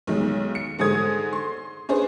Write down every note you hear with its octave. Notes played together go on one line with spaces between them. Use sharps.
B1 D#3 G#3
C#7
G#2 D3 G#4 C5 D#6 G#6
C6
C#4 D4 G#4 B4 C5